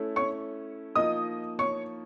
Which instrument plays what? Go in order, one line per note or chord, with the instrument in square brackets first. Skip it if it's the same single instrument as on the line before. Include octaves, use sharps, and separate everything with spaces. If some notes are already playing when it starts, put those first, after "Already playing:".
Already playing: [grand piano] A3 C#4 E4 A4
[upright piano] C#5 C#6
[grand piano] F3 A#3 D#4 [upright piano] D#5 D#6
[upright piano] C#5 C#6